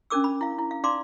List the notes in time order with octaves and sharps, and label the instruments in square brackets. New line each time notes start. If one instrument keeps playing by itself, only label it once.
[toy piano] C#4 D4 A#4 D6 E6
B5
E4 F5
E4
F5
D#4 D5 F5 A#5 C6 D6